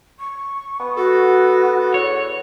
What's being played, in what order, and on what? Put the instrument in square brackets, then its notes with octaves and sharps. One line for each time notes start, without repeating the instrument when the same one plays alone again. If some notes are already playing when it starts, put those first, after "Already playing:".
[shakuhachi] C#6
[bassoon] B3
[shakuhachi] F#4 [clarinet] A4
[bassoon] E2 [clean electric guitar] C#5